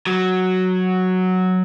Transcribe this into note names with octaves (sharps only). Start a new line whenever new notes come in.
F#3